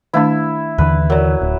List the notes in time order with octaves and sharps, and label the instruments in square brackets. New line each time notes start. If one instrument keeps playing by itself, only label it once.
[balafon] D#3 A3 D4 [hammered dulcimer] E4
[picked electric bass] D#2 D3 E3 [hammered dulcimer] B4
[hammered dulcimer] F#3 [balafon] A#4 D5
[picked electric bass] D1